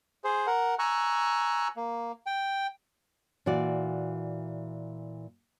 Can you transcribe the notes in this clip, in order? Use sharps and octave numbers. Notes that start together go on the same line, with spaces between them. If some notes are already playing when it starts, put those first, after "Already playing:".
G#4 C5
A#4 F#5
G#5 A#5 C#6 E6 F#6
A#3
G5
A#2 E3 F#4 D5